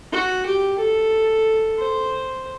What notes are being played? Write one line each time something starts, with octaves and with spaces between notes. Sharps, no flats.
F#4
G4
A4
C5